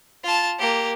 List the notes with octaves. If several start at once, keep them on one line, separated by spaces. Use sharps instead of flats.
F4 A5
A#3 G4